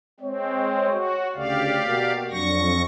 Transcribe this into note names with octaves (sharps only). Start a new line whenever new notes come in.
G#3 C4 C#5
F#4
D2 C#3 G4 D5 F5
B2 A#3 F#4
F2 F#3 D4 C#6 A#6